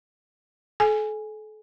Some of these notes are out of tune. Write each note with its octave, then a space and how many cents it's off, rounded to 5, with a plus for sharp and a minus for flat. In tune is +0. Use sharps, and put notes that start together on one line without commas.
A4 -35 G#5 +0